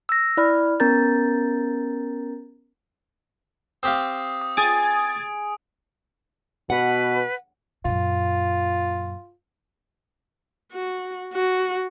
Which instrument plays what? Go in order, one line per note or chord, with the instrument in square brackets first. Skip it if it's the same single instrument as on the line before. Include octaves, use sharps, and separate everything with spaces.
[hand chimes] E6 A#6
E4 D5 B5 F6
B3 C#4 A#4 A#5 G6 A6
[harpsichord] C4 G4 F5 [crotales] D#6
[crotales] D#6
[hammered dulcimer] G#4 [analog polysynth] D#6 G#6 A6 [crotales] D7
[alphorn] B2 [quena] B4 [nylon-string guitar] F#5
[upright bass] F#2 A#2 [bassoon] F4
[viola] F#4
F#4